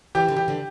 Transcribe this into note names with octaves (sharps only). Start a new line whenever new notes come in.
E3 G4
D3
E3 G4
D3